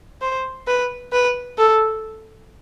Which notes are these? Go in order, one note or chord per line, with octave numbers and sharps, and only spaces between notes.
C5
B4
B4
A4